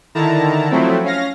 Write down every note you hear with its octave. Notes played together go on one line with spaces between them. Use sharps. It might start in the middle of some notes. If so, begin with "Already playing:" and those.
D3 D#3 E4 A5 A#5
F3 F#3 A3 C4 E4
C#4 F5 A#6